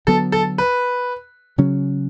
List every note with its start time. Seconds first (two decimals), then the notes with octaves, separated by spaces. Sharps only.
0.07 D3 F#3 B3 A4
0.32 A4
0.58 B4
1.58 C#3 F#3 C#4